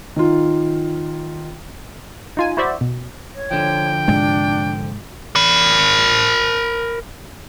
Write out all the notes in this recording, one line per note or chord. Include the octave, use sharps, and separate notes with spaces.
D#3 F4
D#4 F4 G#5
E4 F#4 C5 D5 E5
B2
C#5
D3 F3 G5
G#2 C3 G#3 D4
A#4 B5